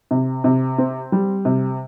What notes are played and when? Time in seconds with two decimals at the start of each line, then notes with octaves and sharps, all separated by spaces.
0.11 C3
0.44 C3
0.78 C4
1.12 G3
1.45 C3